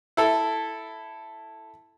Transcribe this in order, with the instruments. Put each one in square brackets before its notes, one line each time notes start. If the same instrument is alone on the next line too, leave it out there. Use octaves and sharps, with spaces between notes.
[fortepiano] E4 A4